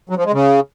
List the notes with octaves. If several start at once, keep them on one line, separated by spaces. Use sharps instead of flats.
F#3
F3
G#3
C#3